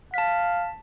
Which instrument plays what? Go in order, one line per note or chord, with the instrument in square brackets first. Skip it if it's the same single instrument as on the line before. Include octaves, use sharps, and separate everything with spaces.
[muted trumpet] F5 [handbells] A5 B6